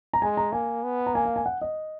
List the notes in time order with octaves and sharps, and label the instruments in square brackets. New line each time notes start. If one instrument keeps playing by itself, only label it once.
[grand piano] A#5
[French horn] G#3 [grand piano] G#5
[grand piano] A#5
[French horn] A#3 [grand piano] G#5
[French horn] B3
[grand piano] A#5
[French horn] A#3 [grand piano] G#5
[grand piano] F5
G#5
F#5
D#5